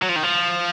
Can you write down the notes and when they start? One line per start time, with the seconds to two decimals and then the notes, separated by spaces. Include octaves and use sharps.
0.02 F#3
0.09 F3
0.16 D#3
0.23 F3